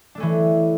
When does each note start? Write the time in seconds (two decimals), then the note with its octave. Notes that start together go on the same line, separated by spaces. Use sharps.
0.15 D4
0.18 A3
0.20 C#4
0.23 E3